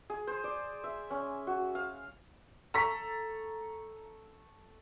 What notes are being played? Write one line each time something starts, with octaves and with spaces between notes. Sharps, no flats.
G#4
C5
D5
E5
C#4
F#4
F5
A4 A#5 C#6 B6